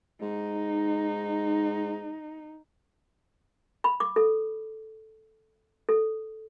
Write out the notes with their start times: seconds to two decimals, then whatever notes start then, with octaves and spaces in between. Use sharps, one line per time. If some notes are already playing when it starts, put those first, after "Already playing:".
0.22 G#2 D#4
3.84 B5
4.00 D6
4.16 A4
5.89 A4